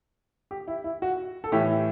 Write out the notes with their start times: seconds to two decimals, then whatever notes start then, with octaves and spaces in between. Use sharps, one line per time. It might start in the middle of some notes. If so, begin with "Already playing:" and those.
0.51 G4
0.68 E4
0.84 E4
1.02 F#4
1.44 A4
1.52 A2 E3 A3 G4